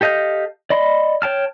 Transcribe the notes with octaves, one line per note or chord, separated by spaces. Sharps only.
G4 A4 D#5 F5 G6
D5 D#5 B5 C6
C#5 G5 A5 F6